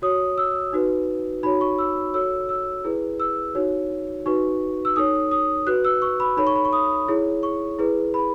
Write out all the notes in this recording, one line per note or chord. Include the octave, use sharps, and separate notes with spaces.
F#4 C#5 D#6
E6
D#4 F#4 B4
D#4 F#4 C#5 B5
C#6
E6
F#4 A4 C#5 E6
E6
E4 G#4 B4
E6
D#4 F#4 C#5
D#4 F#4 B4 C#6
E6
D#4 A4 C#5 D#6
D#6
F#4 B4 F#6
E6
C#6
B5
D#4 A4 C#5 B5
C#6
B5
C#6
D#6
E4 G#4 C#5
C#6
E4 G#4 B4
B5